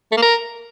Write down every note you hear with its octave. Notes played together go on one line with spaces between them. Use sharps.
A3
A#3
A#4